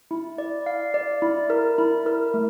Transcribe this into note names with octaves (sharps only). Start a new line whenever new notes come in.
E4
D5
F5
D5
E4
A#4
E4
A#4
A3